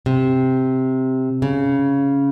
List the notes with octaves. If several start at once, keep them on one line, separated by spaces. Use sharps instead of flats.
C3
C#3